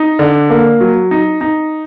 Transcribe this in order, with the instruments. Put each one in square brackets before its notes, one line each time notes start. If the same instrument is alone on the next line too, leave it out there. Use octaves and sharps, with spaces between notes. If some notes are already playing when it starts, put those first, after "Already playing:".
Already playing: [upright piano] D#4
D3
A#3
F#3
D#4
D#4